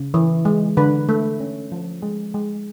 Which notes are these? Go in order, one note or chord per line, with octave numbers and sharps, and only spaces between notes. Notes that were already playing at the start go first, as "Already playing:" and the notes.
Already playing: C#3
E3
G#3
D3 B4
A3
C#4
F3
G#3
G#3